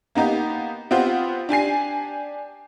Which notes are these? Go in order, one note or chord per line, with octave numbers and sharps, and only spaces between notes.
A#3 B3 D#4 G4
B3 C4 F4 G4 C5 F#5
D4 G4 G#5 C7